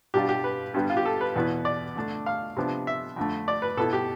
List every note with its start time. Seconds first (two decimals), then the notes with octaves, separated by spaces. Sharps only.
0.14 B2 G3 D4 F4 G4
0.29 G4
0.44 B4
0.74 G2 D3 G3 B3
0.90 F4
0.97 G4
1.05 A4
1.21 B4
1.36 E2 B2 B3 E4
1.65 D5
1.96 D3 A3 D4
2.26 F5
2.57 C3 F3 B3 D4
2.87 E5
3.16 F2 D3 A3
3.48 D5
3.62 B4
3.77 B2 B3 E4 A4
3.93 G4